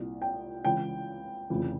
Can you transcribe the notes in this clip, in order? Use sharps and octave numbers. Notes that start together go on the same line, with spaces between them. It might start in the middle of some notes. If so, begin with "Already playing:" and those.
Already playing: C2 A#2
G5
C#2 C#3 E3 G5
F1 F2 C#3 E3